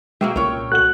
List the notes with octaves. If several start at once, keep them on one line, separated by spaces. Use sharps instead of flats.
B2 G#3 A#3 F#4 G#4 E5 G5 E6
C2 A#2 C#3 A#4 C#5
A3 F#4 F#6 F#7